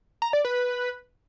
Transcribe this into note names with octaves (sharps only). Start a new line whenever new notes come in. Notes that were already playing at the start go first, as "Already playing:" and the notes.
A#5
D5
B4